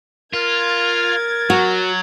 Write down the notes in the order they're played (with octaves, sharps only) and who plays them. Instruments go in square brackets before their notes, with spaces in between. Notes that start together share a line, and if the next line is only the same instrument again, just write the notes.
[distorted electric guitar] F4 [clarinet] A#4 [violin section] G#6 A6
[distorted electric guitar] F#3 [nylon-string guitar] F#4